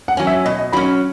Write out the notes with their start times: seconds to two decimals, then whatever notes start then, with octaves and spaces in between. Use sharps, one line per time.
0.08 F#5
0.17 F#3 C#4
0.27 E5
0.45 B2 D#5
0.58 D#5
0.72 F#3 C#4 B5